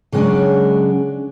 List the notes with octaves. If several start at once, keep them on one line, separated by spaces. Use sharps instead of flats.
C#3 F#3 G#3 B3 C#4 D4